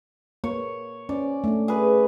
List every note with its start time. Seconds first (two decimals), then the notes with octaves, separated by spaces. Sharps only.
0.44 A#3 C#5
1.09 C#4 C5 D5
1.44 A3 D4
1.68 G#4 B4